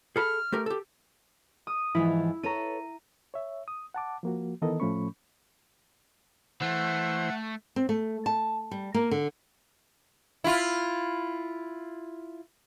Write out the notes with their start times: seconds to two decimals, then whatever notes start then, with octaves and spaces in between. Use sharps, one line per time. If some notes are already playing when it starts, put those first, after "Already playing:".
0.16 G#4 A4 B5 F6
0.52 A3 G4 A#4
0.66 G4 A4
1.67 D#6
1.95 G#2 E3 F3 E4
2.43 A4 B4 C#5 A#5 D#7
3.34 C#5 E5
3.68 D#6
3.94 F#5 A5 D6
4.23 F3 A#3 F#4
4.62 D#3 E3 B3 A4 A#4 D#5
4.80 A2 F3 A3 C#4 B5 C#6
6.61 E3 A3 C5 F#5
7.76 C4
7.89 A3
8.26 A5
8.71 G3
8.94 A#3
9.11 D3
10.44 E4 F4